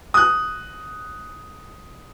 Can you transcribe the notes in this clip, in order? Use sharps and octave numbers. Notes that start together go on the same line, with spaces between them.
D#6 F#6